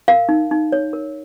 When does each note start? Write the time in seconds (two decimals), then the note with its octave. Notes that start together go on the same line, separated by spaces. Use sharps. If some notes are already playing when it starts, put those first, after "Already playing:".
0.08 A#4 F5
0.29 D#4
0.51 D#4
0.72 C#5
0.93 A#4